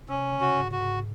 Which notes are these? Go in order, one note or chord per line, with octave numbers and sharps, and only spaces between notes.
C3 C#4
C#3
F#4
G#2
F#4
G#2